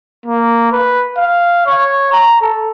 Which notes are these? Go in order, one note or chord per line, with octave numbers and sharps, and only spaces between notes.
A#3
B4
F5
C#5
A#5
A4